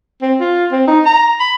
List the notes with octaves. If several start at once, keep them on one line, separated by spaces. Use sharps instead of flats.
C4
F4
C4
D#4
A#5
B5